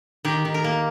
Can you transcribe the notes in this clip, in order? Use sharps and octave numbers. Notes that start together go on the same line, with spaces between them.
D#3 G4
D#3
A#4
A#3